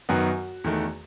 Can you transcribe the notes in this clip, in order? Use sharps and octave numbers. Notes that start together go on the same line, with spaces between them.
F#2 D#3 F#3 B3 F#4
E2 D#3 A3